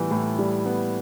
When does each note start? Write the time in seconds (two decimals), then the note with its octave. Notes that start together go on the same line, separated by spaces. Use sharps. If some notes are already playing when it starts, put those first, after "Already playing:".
Already playing: A2 E3 G3 B3
0.11 A2
0.39 G3
0.66 B3